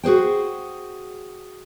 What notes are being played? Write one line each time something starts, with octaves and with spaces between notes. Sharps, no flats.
F#4 G#4 C5 G5